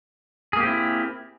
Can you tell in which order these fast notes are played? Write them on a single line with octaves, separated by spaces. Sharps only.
G#4 A#3 G4 C4 E4